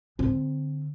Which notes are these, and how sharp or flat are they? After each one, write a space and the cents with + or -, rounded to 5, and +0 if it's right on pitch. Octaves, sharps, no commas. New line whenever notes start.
D3 +0 C4 +0